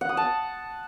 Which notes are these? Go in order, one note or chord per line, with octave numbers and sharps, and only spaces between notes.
F#5
D#6
A5